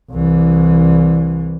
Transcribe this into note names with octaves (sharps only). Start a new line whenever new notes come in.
C2 E3